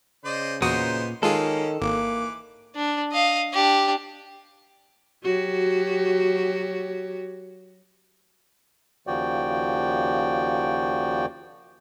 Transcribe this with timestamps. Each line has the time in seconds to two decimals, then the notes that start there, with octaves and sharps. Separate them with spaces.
0.25 C#3 C5 D5 D#5
0.62 E2 A#2 B3 D#4 F#4 C5 D#6
1.23 D#3 G#3 A#3 C#4 F4 G#4 A4
1.81 G#1 E3 A#3 D6
2.75 D4
3.12 D#5 F5
3.53 D4 G4
5.23 F#3 F#4 G4
9.07 D#2 C#3 F3 F#4 D5 G5